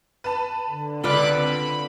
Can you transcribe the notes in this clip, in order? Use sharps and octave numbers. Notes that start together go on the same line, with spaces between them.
B4 A5 B5
D3
C#2 D3 F4 B4 D5 B5 D6 F#6
C4 B5